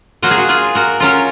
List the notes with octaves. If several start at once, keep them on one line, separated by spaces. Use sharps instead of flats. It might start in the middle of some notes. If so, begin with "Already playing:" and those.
F#3 A#3 F4 F#4
G#4
F#4
F4 G#4
F#4 A#4
F#3 C#4 F4 A#4 C#5